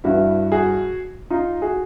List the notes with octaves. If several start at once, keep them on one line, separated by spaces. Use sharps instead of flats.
G2 E3 E4 F#4
F#4 G#4
D#4 F4
F#4 G#4